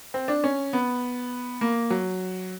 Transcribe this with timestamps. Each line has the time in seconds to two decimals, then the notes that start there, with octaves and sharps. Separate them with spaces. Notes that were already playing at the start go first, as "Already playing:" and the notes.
0.14 C4
0.28 D4
0.44 C#4
0.73 B3
1.61 A#3
1.90 F#3